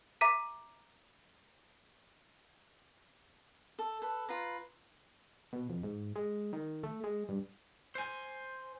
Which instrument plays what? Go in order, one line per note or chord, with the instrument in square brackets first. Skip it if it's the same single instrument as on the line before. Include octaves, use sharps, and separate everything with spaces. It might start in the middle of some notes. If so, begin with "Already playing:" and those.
[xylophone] E5 A#5 D6 B6 D#7
[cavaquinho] A4
A4 B4
F4 B4 A#5
[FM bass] B2
F2
G#2
G#3
D#3
A3
G#3
G2
[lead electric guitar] C5 G#5